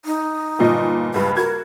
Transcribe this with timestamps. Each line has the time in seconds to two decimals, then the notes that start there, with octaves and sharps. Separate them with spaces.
0.05 D#4
0.59 G1 A#2 D#5
1.14 C#2 G2 B4
1.36 F#4 A#4 G#6